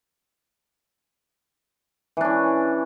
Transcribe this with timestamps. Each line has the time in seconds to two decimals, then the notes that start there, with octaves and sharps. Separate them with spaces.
2.17 E3
2.21 D4
2.25 C#4